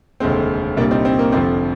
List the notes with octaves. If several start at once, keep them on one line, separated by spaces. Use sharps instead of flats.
F1 D#2 D3 G#3 C4
C2 A#2 G3 A#3 D4
C4 D#4
C4
A#3
F1 F2 D3 F3 C4